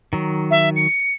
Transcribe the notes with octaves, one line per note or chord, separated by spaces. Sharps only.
D#3 F#3
E5
C#7